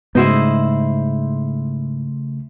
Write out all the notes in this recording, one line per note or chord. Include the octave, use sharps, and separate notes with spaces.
G#2 C#3 A3 B3 E4 F#4 C5 D#5